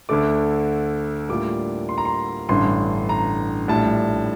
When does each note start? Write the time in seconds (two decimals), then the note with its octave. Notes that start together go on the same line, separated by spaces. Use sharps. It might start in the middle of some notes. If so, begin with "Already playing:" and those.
0.09 D2 D3 A3 D6
1.29 A2 G3 A#3 D4 F4 D6
1.89 C6
1.98 A#5
2.05 C6
2.49 A1 G2 D3 C6
3.09 A#5
3.68 A#1 A2 G3 D4 A5